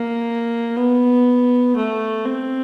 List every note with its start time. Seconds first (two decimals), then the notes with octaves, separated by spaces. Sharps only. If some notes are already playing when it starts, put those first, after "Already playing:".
Already playing: A#3
0.76 B3
1.76 A3
2.25 C4